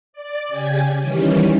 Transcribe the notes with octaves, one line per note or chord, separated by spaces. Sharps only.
D5
C#3 G4 G#5
D#3 E3 G3 C#4